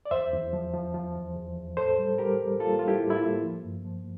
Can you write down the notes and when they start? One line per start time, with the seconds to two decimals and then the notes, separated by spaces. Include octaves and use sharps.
0.05 D5
0.11 E2 C5 E5
0.33 E2
0.53 F3
0.74 F3
0.94 F3
1.15 E2
1.36 E2
1.56 E2
1.77 A2 A4 C5
1.99 G3
2.18 G3 G4 A#4
2.40 G3
2.60 A#3 F4 A4
2.79 G3 F4
2.88 E4 G4
3.02 A2
3.10 E4
3.16 F4
3.23 A#3
3.43 F3
3.64 G2
3.85 F3